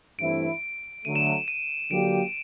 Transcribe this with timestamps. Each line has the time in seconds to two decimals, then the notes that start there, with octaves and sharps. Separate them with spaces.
0.19 G2 E3 A3 C4 E4 D7
1.05 D3 F#3 A3 D#7
1.16 E7
1.27 E7
1.48 D#7
1.90 D3 F#3 A#3 D4 G4 D7